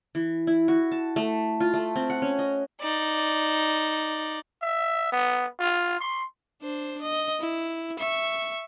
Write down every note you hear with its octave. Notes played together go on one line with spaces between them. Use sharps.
E3
E4
F#4
A5
A3
F4
A3
C4
F#5
C#4
D#5
D#4 D5
E5
B3
F4
C6
D4 C5
D#5
E4
E5 C#6